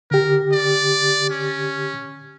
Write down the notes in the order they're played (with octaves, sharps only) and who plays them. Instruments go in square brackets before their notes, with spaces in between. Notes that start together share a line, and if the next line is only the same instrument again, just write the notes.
[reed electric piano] D3 G4 [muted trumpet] A#4
[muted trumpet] D5
C#4